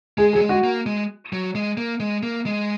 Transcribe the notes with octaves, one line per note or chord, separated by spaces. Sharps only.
G#3 G#4
G#4
F#3
G#3
F#4
A#3
G#3
F#3
G#3
A#3
G#3
A#3
G#3